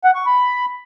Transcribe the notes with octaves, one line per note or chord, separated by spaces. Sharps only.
F#5
C#6
B5